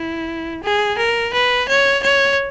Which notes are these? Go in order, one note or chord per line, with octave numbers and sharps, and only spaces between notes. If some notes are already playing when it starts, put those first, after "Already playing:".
Already playing: E4
G#4
A#4
B4
C#5
C#5